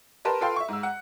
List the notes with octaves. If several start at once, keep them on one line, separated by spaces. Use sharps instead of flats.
G4 A#4 B4 A5 C6
F4 A4 B4 F5 G5 C6
E5 C#6
G#2 E6
F#5